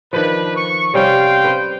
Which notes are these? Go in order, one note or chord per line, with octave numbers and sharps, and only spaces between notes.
D#3 F3 D4 B4
C#6
C3 G3 C#4 F5 G5 C6
B4 C5